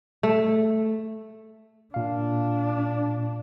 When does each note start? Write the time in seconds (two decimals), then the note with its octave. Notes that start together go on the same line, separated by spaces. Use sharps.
0.23 A3
1.94 A#2 D4 F5